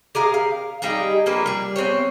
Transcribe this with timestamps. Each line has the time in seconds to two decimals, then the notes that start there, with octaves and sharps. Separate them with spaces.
0.15 G4 G#4 A#4 F5
0.34 F5
0.82 G3 D#4 G4 G#4
1.26 F3 A#3 D4 B4
1.46 G3 G#4
1.76 B3 C4 C5 C#5